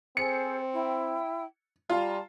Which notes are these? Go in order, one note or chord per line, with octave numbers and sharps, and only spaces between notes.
C4 G#4 A4 C5 C#7
E4 G5
G3 F4 A5 A#5